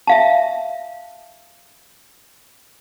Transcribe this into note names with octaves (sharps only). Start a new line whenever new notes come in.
E5 F5 A5